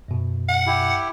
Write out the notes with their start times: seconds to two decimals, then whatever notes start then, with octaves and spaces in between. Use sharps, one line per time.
0.08 F#2 B2
0.49 F#5
0.67 E4 G4